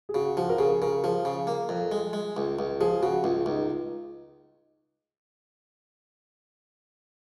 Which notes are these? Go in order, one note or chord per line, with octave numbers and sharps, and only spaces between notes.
G#4
C#3 F#4
F3 F#4
A#4
C#3 G#4
C#3 A#4
F3 G#4
C#3
A#3
F2
G#3
G#3
C#2
C#2
F3 G#4
C#3 F#4
C#2 F4
C#2 D#4